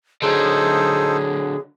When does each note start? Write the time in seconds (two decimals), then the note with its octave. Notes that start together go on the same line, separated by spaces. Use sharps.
0.22 D3 F#3 D#4 G#4 A4 C5